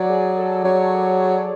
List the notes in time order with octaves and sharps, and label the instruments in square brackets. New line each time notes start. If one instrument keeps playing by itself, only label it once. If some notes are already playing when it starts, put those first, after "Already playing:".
Already playing: [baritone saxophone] F#3 [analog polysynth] D5
[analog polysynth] G#4
A4
[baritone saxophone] F#3 [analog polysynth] C#5